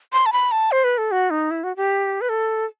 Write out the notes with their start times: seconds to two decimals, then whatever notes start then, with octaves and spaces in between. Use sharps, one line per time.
0.13 C6
0.26 A5
0.33 B5
0.52 A5
0.72 C5
0.84 B4
0.98 A4
1.11 F#4
1.30 D#4
1.51 E4
1.64 F#4
1.77 G4
2.21 B4
2.29 A4